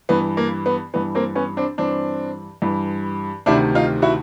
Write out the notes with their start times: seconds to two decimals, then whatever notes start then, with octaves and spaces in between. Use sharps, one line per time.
0.09 G2 E3 B3
0.37 A#3
0.66 B3
0.94 G2 E3 B3
1.15 A#3 C4
1.35 B3 C#4
1.57 C4 D4
1.78 G2 E3 C4 D4
2.62 G2 E3
3.46 D2 C3 D#3 D4 E4
3.75 D#4 F4
4.02 E4 F#4